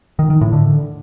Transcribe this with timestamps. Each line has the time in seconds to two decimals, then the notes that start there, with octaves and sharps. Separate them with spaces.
0.19 D#3
0.30 D#3
0.41 A2
0.52 D3